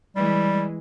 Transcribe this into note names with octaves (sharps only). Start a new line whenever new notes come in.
E3 G3 G#3